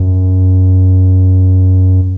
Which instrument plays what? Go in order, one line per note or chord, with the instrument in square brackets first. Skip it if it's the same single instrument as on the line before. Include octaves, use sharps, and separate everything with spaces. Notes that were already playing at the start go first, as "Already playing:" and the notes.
Already playing: [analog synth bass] F#2